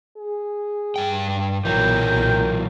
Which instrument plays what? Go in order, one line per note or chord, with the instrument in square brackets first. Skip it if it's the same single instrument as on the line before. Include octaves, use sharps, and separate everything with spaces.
[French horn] G#4
[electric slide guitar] G2 G5
[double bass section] B1 A#2 [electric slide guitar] E3 F#3 [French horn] A#4 [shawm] G5